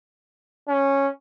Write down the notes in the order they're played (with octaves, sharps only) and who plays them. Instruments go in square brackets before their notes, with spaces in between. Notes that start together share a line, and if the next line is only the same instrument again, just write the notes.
[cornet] C#4